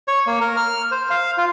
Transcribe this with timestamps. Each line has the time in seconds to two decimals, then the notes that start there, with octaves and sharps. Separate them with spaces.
0.08 C#5
0.27 A#3
0.41 A#4
0.57 F6
0.91 C5
1.10 F5
1.38 F4